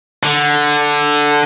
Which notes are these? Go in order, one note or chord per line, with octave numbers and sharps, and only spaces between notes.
D3